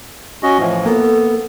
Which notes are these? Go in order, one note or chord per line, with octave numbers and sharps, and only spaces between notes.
C#4 F#4 D#5
A2 E3 F3
A#3 B3 A4